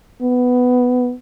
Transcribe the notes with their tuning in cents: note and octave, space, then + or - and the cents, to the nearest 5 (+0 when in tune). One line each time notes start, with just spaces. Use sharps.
B3 +10